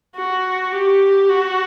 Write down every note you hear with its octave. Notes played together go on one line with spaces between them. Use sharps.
F#4
G4
F#4